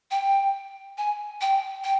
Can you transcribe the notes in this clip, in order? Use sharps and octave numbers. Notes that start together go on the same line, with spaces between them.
G5
G#5
G5
G5